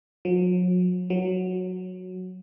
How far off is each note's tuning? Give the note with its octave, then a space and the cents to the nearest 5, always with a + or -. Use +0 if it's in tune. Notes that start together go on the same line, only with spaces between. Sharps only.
F#3 -40
F#3 -10